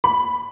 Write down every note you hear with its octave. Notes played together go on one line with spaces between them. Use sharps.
B5